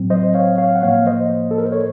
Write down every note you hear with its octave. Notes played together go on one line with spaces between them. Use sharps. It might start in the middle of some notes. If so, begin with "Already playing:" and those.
Already playing: A2 F#3 C4
C5 D#5
C#5 F5
C#5 F5
F#5
A2 F3 A#3 C#5 F5
C5 D#5
A4
A#4
C5
C#5